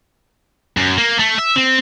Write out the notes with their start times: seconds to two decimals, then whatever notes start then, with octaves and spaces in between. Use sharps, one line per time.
0.77 F#2
0.98 A#3
1.19 A3
1.38 E5
1.56 C4